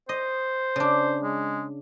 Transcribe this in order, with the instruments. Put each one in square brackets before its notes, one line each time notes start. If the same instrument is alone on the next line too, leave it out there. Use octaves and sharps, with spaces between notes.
[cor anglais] C5 [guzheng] D#5
[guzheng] C#3 D4
[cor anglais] G#3